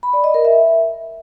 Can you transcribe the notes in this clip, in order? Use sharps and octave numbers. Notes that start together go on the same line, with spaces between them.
B5
D5
D#5
A#4
E5